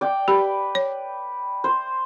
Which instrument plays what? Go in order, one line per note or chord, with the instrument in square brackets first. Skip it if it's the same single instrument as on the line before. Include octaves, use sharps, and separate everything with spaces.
[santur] D5 G5
[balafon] G4 [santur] B4
[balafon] C#5
[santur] C5